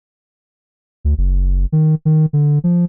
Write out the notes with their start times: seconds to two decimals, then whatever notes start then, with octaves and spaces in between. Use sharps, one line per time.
1.05 D2
1.18 F#1
1.72 D#3
2.05 D#3
2.33 D3
2.64 F3